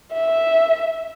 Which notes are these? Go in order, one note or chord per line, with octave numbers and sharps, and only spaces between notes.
E5